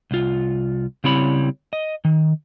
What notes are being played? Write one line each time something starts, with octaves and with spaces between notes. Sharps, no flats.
C2 F4
C#3 G3 C4 E4 C#5 B5
D#5
D#3